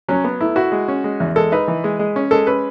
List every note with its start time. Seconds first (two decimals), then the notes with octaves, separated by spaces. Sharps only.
0.08 F#3 C#4
0.24 B3
0.40 A3 E4
0.56 E4 F#4
0.72 G#3
0.88 C#4
1.04 G#3
1.20 E2
1.36 G#3 A4
1.52 D#4 B4
1.68 E3
1.84 G#3
1.99 G#3
2.16 C#4
2.31 G#3 A4
2.47 C#4 B4